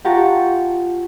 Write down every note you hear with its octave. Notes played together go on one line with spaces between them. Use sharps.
F4 G4 F#5 A5 A#5 C#6